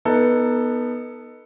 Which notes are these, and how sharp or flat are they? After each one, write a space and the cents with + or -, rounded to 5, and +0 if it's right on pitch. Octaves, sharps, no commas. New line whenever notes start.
B3 -15 D#4 +0 A4 +10